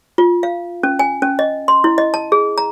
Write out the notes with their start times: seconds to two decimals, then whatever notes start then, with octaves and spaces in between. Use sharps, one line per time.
0.18 F4
0.43 F5
0.83 C#4
0.99 G#5
1.22 C#4
1.39 D#5
1.68 C6
1.84 E4
1.98 D#5
2.14 A5
2.32 G#4
2.58 A#5